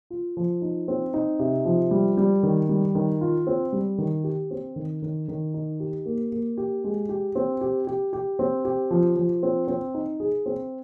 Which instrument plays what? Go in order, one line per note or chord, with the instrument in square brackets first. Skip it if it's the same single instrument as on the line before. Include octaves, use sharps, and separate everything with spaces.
[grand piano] F4
F3
D#4
C4
D#4
C3
F3
G3
G3
D#3
G3
D#3
F4
C4
G3
D#3
G4
C4
D#3
D#3
D#3
D#4
G4
A#3
A#3
G4
G#3
G4
C4
G4
G4
G4
C4
G4
F3
F3
C4
C4
D#4
G#4
C4